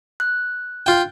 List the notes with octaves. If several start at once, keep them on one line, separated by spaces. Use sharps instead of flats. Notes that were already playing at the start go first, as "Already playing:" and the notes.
F#6
F4 G5